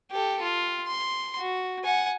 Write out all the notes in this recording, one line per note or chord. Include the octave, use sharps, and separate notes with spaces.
G4 A4
F4
C6
F#4
F#5 G#5